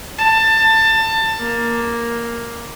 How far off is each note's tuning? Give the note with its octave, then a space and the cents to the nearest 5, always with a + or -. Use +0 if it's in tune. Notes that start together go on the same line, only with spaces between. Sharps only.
A5 +20
A#3 +5